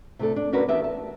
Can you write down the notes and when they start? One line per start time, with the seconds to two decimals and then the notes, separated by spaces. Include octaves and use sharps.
0.19 C3 A3 D4 A4
0.36 D4
0.53 C#4 D4 F#4 A#4 B4
0.68 E2 B3 D4 G4 E5
0.84 A5